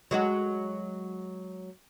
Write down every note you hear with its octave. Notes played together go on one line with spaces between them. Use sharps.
F#3 G#3 F#4